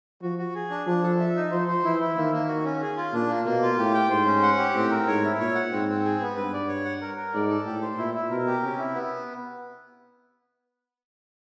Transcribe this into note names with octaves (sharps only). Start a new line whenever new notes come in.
F3 F#4
F#4
G#4
D4
F3 D4
A4
E5
D#4
F3 C5
C5
E3 E4
E4
D#3 A#3
A#3
F#4
C#4
G#4
F4
A#2 D4
A#3
B2 A#3
F4
A2 G4
G5
G#2 C5
C#4
F#5
G4
A2 C4
A#4
G#2 C#5
E4
A#2 C#5
F#5
G#2 C4
C4
G#4
B3
G2 B4
D5
C#5
F#5
A#4
A#4
G#2 D5
A4
A2 G4
C5
A#2 E4
E4
B2 A#4
G4
C3 C#4
E4
B3